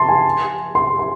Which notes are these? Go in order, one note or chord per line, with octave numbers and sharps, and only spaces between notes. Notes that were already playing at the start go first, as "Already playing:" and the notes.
Already playing: A5 C6
G#5
C6
C6